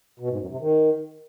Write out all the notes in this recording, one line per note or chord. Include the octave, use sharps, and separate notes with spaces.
B2
G#2
F#2
C3
D#3